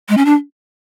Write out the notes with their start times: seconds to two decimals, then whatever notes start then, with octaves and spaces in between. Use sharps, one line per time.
0.09 G#3
0.17 C#4
0.25 D4